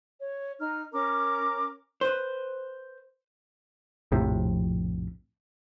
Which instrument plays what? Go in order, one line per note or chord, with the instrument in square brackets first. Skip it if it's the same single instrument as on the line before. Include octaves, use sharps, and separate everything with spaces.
[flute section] C#5
D#4 A#5 F6
C#4 A#4 A#5 D6
[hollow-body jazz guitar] B4 C5
[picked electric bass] A#1 F2 A2 C3